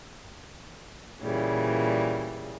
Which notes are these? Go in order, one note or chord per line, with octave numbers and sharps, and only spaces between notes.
A#2 C#3 E3 G3